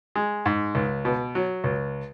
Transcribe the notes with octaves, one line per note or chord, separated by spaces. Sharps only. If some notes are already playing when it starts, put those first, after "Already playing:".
G#3
G#2
C#2
B2
F#3
C#2